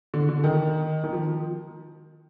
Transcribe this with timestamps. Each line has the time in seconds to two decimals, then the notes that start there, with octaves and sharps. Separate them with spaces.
0.14 D3
0.29 D3
0.44 D#3
1.04 D#3
1.13 F3